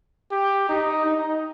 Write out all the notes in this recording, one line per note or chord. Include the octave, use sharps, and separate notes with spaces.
G4
D#4
D#4